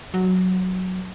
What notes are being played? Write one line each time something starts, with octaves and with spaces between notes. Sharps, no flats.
F#3